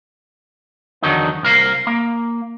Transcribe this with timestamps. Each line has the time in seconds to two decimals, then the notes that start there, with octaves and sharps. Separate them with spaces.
1.02 E2 D3 D#3 F#3 D#4
1.43 C2 A#4 F5
1.87 A#3